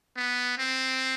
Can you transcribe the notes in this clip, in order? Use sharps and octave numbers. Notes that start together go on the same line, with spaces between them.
B3
C4